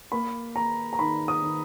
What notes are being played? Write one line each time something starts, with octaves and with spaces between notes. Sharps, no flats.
A#3 B5
A#3 A#5
A#5
D#3 B5
D#6
D#3